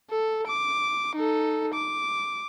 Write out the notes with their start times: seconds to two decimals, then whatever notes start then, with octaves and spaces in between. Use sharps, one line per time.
0.10 A4
0.47 D6
1.16 D#4 A4
1.74 D6